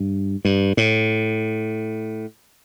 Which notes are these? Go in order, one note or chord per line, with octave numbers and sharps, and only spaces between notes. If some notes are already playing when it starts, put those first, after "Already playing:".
Already playing: G2
G2
A2